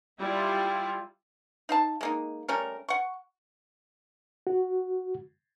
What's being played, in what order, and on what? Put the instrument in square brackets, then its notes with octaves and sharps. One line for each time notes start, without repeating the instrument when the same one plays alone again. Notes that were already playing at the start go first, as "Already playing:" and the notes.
[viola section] G3 E4 F4
[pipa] D#4 F5 A5
G#3 A#3 D#4
G3 A3 C#4 A#4
F#5 C#6
[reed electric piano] F#4